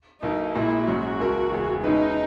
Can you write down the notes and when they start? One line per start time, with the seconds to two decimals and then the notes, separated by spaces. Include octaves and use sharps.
0.23 B1 B2 A#3 D#4 E4
0.55 A#1 A#2 G#3 E4
0.87 A#1 G#2 F#3 C#4 F#4
1.20 C#2 B2 A#3 E4 A#4
1.52 E1 E2 C#3
1.84 B2 G#3 C#4 D#4 E4 B4